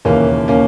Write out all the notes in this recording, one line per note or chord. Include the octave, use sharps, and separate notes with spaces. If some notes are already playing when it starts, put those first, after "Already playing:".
E1 D#2 C#3 E3 A#3 C#4
A#3 C#4